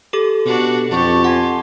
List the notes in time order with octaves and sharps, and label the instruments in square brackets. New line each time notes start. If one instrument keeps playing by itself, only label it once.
[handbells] G4 A4 D6
[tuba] B2 [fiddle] D4 F#4
[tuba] F2 [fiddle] G4 [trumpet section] A5 C#6
[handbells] F#5 [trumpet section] G#5 A5 C6